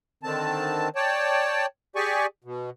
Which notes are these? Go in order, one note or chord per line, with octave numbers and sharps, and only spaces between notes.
D3 D#3 C4 A5
C#5 D5 G5 A5
G4 G#4 D5 G#5 C#6
B2